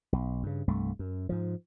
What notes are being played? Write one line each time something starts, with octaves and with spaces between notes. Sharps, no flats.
B1
G2 C#3
C2 G2 A3
F#2
G#2 F3